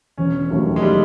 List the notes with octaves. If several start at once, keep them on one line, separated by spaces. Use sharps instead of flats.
E1 C#4
D#2 D#3 F#3 A3
G#3
G3